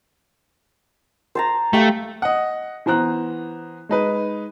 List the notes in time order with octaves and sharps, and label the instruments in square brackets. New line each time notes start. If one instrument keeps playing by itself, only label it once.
[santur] C5 A5 A#5
[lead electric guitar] A3 [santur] G4 F5 A5
[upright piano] D#5 F#5
E3 B3 C5 A#5 F#6
G#3 D#4 B4